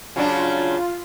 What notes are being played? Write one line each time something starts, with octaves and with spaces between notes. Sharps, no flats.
C#3 F#3 D4 F4